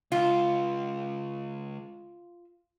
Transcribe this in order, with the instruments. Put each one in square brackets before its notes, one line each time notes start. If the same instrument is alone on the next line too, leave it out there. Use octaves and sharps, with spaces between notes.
[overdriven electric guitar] C#2 [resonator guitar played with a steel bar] F4